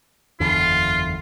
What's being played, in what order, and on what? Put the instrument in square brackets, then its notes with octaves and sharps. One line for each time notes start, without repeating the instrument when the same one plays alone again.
[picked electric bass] F#1 E2 D3 [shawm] F4